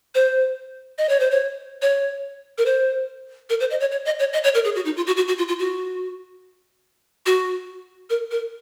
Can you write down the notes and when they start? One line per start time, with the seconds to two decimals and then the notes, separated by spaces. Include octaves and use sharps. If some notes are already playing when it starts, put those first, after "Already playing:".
0.15 C5
0.98 D#5
1.09 C#5
1.20 C5
1.31 C#5
1.82 C#5
2.58 A#4
2.66 C5
3.50 A#4
3.60 C5
3.70 D#5
3.80 C#5
3.91 C#5
4.06 D#5
4.19 C#5
4.33 D#5
4.44 C#5
4.55 A#4
4.65 G#4
4.75 F#4
4.85 D#4
4.97 F4
5.07 F#4
5.17 F#4
5.28 F#4
5.38 F4
5.48 F4
5.59 F#4
7.26 F#4
8.10 A#4
8.31 A#4